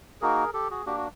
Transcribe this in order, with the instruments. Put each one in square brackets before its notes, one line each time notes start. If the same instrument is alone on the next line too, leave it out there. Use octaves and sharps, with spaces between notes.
[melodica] A#3 D#4 F#4 G#4 A#4
G4 A4
F#4 G#4
A#3 D4 F#4 G4
F#4